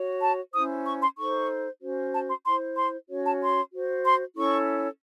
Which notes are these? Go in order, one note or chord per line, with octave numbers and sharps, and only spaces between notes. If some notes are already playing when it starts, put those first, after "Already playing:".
Already playing: F#4 C#5
A5
C#4 E4 C5 D#6
C#6
C6
D#4 A4 C5 C#6
C#4 F#4 C5
A5
C6
E4 C5 C6
C6
C#4 F#4 C#5
A5
C6
F#4 C5
C6
C#4 E4 A4 C#5 C#6